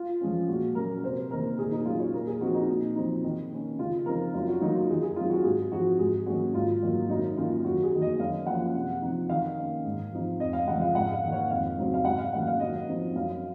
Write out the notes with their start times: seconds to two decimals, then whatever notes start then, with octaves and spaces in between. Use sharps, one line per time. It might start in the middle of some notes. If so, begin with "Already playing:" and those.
Already playing: F4
0.21 F3 G#3 C#4
0.48 A#2 F#4
0.75 F#3 A#3 C#4 A#4
1.04 C3 C5
1.31 D#3 A#3 A#4
1.58 A#2 G#4
1.72 D#4
1.85 F#3 C#4 F4
2.00 C#5
2.13 A#2 A#4
2.27 G#4
2.41 F3 C4 D#4 F#4
2.54 D#4
2.69 A#2
2.96 F3 C4 D#4
3.24 D#3
3.51 A#3 C#4
3.79 C#3 F4
4.06 F3 C4 D#4 A#4
4.34 F#2 F4
4.48 F#4
4.61 D#3 F#3 A#3 D#4
4.75 F4
4.89 D#3 G#4
5.02 G#4
5.16 F#3 C4 D#4 F4
5.30 F#4
5.44 G#2 G#4
5.72 F3 C4 D#4 F#4
5.99 G#2 G#4
6.26 D#3 F#3 A#3 C#4 F#4
6.54 G#2 F4
6.82 D#3 F#3 A#3
7.09 F#2 D#4
7.36 D#3 A#3 C#4 F4
7.64 F#2 F#4
7.83 G#4
7.92 D#3 A#3
8.02 D#5
8.19 F#2 F5
8.47 F3 A#3 C#4 F#5
8.74 C3
9.02 F3 C4 D#4
9.29 D#3 F5
9.57 A#3 C#4
9.85 G#2
10.12 F3 C4 D#4
10.40 F2 D#5
10.53 F5
10.67 C#3 F3 G#3 F#5
10.82 F5
10.95 G#2 F#5
11.14 F5
11.23 D#3 A#3
11.32 C#5
11.50 F2 F5
11.78 C#3 F#3 C4 D#4
11.94 F5
12.05 G#2 F#5
12.18 F5
12.32 D#3 F#3 A#3 C#4 F#5
12.47 F5
12.60 F#2 D#5
12.87 F3 C4 D#4
13.15 F#2 F5